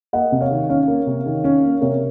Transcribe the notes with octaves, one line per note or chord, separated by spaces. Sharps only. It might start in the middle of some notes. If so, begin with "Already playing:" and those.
A#3 D#5 F#5
C3
C#5 F5
D#3
C#4 C#5 F5
A#3
C3
D#3
C#4
A#3
C3 A#4 C#5